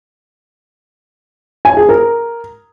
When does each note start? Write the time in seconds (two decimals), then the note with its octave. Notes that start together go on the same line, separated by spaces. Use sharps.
1.65 G#5
1.77 G#4
1.89 A#4